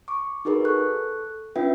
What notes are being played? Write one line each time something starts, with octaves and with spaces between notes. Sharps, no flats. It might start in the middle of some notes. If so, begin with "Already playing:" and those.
C#6 D6
D#4 F#4 G#4 A#4 B4
A4 C#6 F#6
C#4 D4 F4 B4 E5 G5